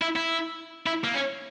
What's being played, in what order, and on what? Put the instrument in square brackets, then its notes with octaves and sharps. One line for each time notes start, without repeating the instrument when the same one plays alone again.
[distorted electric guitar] E4
E4
E4
A#3
C#4